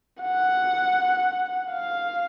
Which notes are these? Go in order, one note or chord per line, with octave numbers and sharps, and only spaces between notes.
F#5
F5